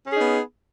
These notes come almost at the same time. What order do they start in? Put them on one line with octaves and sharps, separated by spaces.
C#4 G#4 D#4 B3